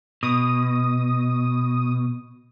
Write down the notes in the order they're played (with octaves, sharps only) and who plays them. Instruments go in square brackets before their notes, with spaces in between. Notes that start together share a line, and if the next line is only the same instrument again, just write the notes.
[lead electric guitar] B2 [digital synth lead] D#6